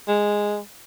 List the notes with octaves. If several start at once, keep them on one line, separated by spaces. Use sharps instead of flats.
G#3